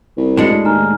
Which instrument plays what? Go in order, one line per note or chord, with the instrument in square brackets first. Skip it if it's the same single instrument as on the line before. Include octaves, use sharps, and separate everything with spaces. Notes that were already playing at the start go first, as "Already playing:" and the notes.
[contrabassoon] C2
[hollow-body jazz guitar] A2 G#3 D4 [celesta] F#4 C#7
[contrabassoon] D#2 [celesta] G#5 A#5 F6